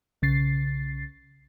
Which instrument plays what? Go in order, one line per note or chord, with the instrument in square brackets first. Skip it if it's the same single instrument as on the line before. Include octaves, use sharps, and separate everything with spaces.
[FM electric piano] B1 C#3 A6 C7